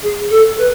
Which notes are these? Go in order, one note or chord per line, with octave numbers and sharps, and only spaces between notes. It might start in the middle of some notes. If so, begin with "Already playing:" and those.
G#4
A4
B4